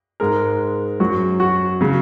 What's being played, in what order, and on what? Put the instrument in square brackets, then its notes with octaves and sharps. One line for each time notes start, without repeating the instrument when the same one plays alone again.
[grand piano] G#2 G#3 A#4
F#2 F#3 F#4
F#4
C#3 F#3